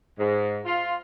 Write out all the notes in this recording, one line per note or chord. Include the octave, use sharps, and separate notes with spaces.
G#2
F4